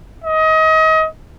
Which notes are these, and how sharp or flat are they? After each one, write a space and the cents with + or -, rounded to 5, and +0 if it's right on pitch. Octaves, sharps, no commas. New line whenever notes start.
D#5 +30